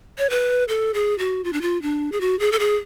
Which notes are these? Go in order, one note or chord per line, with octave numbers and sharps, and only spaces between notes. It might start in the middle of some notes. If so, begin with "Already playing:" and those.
C#5
B4
A4
G#4
F#4
F4
D4
F4
D4
G#4
F#4
G#4
A4
G#4